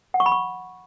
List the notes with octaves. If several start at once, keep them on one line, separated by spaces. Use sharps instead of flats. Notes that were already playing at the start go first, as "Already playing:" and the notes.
F#5
C#6
B5
C#6